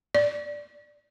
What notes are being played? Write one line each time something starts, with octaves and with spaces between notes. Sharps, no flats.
D5